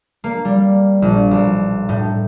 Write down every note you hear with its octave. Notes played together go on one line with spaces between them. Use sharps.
A#3
G3
A#1
B1
A2